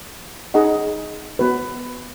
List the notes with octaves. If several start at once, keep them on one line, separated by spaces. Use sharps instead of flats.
D#4 G#4 D#5 F#5
B3 F#4 B4